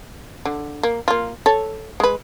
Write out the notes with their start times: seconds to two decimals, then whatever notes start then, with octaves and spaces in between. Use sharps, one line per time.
0.45 D3
0.83 A#3
1.08 A#3 F4
1.46 A4 C#5
2.00 G#3 B4